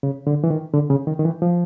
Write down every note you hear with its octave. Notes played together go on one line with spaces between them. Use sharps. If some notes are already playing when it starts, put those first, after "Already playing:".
C#3
D3
E3
D#3
D3
C#3
D#3
D#3
E3
F3